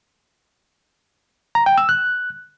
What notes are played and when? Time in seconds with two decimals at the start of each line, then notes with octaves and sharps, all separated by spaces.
1.55 A#5
1.66 G5
1.78 E6
1.89 F#6